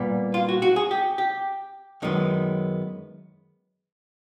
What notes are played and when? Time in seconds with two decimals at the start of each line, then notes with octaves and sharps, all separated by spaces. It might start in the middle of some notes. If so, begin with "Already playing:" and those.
Already playing: A#2 G3 B3
0.34 F4
0.49 F#4
0.62 F#4
0.76 G#4
0.91 G4
1.18 G4
2.02 F#2 D#3 G#3 B3